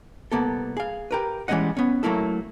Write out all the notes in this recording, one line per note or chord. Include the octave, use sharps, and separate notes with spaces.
C2 A#3 B3 A4
G#4 F5
G4 A#4 B4
E3 G3 G#3 C#4 D#5 F#5
B3 C#4
F#3 A3 A#3 E4 A4